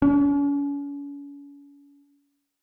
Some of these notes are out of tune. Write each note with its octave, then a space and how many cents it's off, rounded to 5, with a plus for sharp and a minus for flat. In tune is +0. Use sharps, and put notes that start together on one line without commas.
C#4 +40